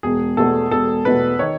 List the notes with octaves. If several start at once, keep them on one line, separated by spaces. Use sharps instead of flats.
E1 G#4
E2 B2 A3 A4
E1 A4
E2 B2 A3 B4
D#3 C#5